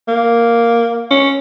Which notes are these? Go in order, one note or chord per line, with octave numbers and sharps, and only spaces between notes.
A#3
C#4